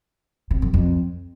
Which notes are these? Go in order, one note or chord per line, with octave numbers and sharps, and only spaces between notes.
C3
F#2
F2